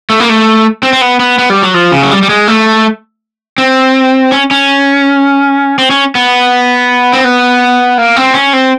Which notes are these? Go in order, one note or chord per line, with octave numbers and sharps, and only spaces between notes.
A3
A#3
A3
C4
C4
B3
B3
B3
G3
F#3
F3
C#3
F#3
G3
G3
G#3
A3
C4
C#4
C#4
C4
C#4
B3
C4
B3
A#3
C4
C#4
C4